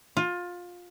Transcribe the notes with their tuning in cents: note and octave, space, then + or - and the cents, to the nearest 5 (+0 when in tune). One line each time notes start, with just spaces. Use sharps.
F4 +20